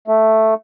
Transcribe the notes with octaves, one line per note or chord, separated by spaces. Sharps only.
A3